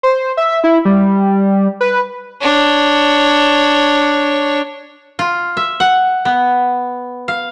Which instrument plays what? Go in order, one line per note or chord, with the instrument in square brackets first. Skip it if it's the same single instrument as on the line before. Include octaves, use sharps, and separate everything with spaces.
[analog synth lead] C5
E5
E4
G3
B4
[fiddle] D4 C#5
[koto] F4
E5
F#5
B3
F5